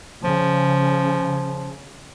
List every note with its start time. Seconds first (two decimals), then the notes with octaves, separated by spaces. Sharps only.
0.24 C#3 F3